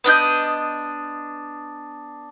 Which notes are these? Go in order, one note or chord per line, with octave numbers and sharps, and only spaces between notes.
B3 D4 D#5 G6